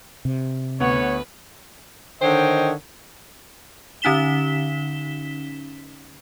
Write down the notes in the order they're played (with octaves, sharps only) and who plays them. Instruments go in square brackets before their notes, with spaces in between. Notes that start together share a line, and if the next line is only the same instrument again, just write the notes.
[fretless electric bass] C3
[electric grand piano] D2 B3 F#5 [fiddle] B4 [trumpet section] C#5
[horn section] D3 D#3 C5 C#5 D#5 G5
[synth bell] D3 C#4 D#4 B6 E7 G7